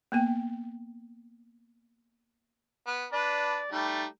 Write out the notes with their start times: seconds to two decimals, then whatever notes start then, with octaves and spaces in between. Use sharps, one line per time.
0.12 A#3 B3 G5
2.87 B3
3.12 D4 B4 D5
3.72 G3 A3 D#4